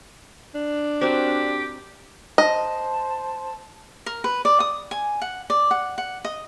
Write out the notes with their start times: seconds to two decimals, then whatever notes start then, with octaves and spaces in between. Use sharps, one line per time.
0.54 D4
1.01 C4 F#4 G4 A#4
2.38 C5 D#5 A5
4.06 A#4
4.24 B4
4.45 D5
4.60 D#6
4.91 G#5
5.22 F#5
5.50 D5
5.71 F#5
5.98 F#5
6.25 D#5